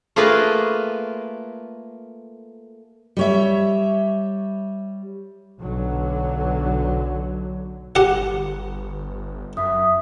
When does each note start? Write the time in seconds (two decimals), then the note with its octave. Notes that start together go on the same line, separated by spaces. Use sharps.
0.16 A3 A#3 F4 G#4 A#4 B4
3.17 G3 C#5 E5
5.61 B1 D3 F#3
7.95 G1 G4 F#5
9.57 F#2 E5 D#6